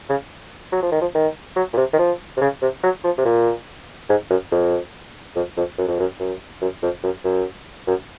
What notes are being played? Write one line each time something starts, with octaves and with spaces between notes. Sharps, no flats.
C#3
F#3
F3
D#3
F3
D#3
F#3
A#2
C3
D#3
F3
C3
C#3
C3
F#3
F3
C3
A#2
G#2
F#2
F2
F2
F2
F#2
F2
F#2
F#2
F#2
F2
F#2
F#2
F#2